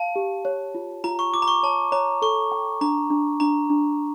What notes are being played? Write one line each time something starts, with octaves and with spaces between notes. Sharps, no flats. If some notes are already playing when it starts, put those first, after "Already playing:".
Already playing: F5 A5
G4
C#5
F4
F4 A#5
C#6
F4 D6
A#5
C#6
C#5 A5
C#5 A#5
A4 C#6
G5
D4 A#5
D4
D4 A#5
D4